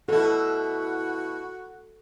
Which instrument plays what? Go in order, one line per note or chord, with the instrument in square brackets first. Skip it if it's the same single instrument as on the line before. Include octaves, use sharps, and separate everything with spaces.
[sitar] B2 E4 [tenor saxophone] F#4 [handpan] A4